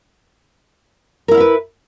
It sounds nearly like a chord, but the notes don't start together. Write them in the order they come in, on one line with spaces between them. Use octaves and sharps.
A#4 E4 F5 E5 B4